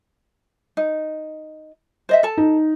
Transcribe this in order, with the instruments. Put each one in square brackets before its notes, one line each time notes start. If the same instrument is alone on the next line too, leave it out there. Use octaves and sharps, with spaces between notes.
[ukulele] D#4
C5 D#5 E5
A4 A5
[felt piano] D#4